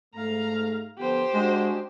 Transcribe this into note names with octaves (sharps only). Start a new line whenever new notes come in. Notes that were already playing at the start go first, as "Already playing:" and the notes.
G#2 A3 F5 A#5
D3 F3 B3 G4 C5
G#3 C#4 D4 F#4